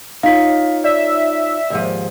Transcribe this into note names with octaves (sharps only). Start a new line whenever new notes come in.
D#4 F4 C#5 F5 B6
D5 E5
D#2 G#2 F3